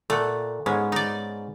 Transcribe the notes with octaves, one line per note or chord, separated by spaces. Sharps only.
A#2 A3 F#5
G#2 G#3 B3 C#4
D#4 D5